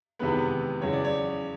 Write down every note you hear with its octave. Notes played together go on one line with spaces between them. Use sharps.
E2 C3 D#3 G#3 B3 B4
E2 C#3 F#3 C#5
D5
C#5